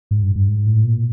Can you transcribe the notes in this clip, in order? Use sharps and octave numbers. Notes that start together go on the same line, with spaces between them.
G#2
G2
G2
G#2
A2
A#2